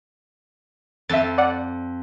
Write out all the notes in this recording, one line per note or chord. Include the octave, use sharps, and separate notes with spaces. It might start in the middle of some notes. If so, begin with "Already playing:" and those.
F2 E5 A6
D5 F#5